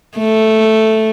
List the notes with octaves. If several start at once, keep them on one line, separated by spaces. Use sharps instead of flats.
A3